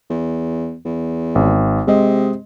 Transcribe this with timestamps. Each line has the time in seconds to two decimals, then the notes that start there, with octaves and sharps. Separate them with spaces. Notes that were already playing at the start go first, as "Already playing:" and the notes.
0.10 E2
0.85 E2
1.35 G#1
1.87 C3 G#3 D#5